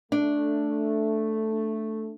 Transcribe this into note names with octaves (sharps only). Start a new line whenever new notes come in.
A3 D4